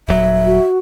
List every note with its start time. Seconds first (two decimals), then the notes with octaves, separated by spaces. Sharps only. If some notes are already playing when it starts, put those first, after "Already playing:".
0.08 D#1 F#3 E5
0.46 F#4